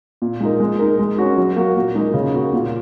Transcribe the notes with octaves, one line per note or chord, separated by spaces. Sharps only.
A#2
G#3 D#4 A#4
G#3
D#4 A#4
G#3
C#4 F#4 A#4
F#3
A#3 F#4
A#2
G#3 D#4 A#4
C#3
A#3 F#4
A#2